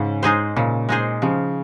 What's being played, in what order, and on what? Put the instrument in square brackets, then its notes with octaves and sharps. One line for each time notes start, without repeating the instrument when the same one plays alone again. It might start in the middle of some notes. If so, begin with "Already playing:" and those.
Already playing: [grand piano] G#2 [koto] C#3
[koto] G#3 D#4 G#4 C5
[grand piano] A#2 [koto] C#3
[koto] G#3 D#4 G#4 C5
[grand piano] C#3 [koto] F3